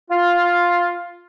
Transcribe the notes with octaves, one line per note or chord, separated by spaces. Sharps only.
F4